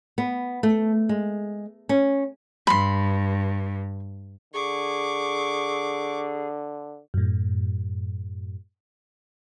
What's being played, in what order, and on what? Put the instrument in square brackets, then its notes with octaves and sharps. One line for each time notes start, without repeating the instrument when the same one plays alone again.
[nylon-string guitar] B3
A3
G#3
C#4
[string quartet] G2 [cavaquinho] B5 C6
[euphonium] D3 [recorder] G#4 [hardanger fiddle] C#6 D6
[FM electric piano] F#2 A2